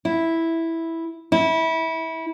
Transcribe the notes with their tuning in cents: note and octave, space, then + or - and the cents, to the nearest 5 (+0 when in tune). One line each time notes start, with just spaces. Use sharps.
E4 -5
E4 -25